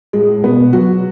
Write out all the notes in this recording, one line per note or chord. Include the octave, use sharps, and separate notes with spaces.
A2 G#3
B2 B3
F#3 F#4